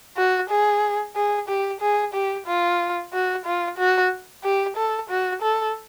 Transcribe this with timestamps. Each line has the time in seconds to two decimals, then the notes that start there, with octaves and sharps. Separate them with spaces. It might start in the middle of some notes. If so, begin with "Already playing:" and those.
0.17 F#4
0.50 G#4
1.16 G#4
1.48 G4
1.81 G#4
2.14 G4
2.47 F4
3.13 F#4
3.45 F4
3.78 F#4
4.44 G4
4.76 A4
5.10 F#4
5.42 A4